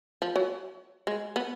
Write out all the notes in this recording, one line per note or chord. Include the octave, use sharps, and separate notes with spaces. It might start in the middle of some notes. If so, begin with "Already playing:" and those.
F3
F#3
G#3
B3